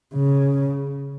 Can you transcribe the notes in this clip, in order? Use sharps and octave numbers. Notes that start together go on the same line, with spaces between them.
C#3